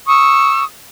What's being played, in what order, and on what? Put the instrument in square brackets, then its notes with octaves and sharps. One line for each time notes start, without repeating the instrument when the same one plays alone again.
[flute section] C#6 D#6 E6